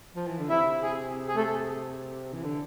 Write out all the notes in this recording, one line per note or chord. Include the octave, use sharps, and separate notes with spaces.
F3
E3
D3
C3 E4 E5
G#4
G#4
A3 A4
E3
D3